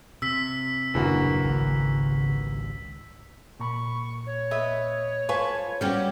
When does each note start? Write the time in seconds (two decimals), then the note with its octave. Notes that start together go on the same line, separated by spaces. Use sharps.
0.22 C3 E6 B6
0.95 D#1 F#2 C#3 E3 A#3 D4 F#4
1.44 G#1 C#2
3.59 A#2 A#5 B5 C#6
4.26 C#5
4.51 B4 D#5 E5
5.29 F4 B4 G#5 A5 C#6
5.81 G3 C#4 F#4 G4 A4